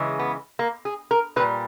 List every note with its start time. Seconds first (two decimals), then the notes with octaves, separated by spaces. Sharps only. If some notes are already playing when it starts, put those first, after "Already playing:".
Already playing: C#3 E3 G#3
0.19 B3
0.59 A#3
0.85 G#4
1.11 A#4
1.36 A#2 B4
1.40 G3